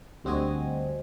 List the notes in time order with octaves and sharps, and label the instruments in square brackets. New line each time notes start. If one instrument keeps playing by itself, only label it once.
[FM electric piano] D2 G3 C4 F#4 D#5 G#5